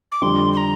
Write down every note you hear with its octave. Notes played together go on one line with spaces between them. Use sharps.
D6
F2 D3 G3 C6
C6
A#5